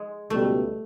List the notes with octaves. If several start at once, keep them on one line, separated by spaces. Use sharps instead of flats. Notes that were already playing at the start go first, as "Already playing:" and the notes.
Already playing: G#3
C#2 B2 G3 A3